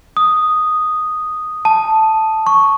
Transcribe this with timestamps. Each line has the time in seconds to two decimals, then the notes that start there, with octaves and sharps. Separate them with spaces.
0.17 D#6
1.65 A5
2.47 C#6